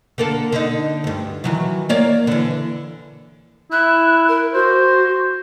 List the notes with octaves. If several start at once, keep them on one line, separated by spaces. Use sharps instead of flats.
D3 A#3 A4
D3 D#4
D2 G2
D#3 E3 F#3
A#3 C#5 D5
D3 E3
E4 F#6
A#4
F#4 C5